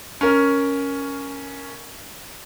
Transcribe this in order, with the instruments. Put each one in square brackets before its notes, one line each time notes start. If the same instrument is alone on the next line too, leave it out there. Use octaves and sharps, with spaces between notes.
[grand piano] C#4 A#4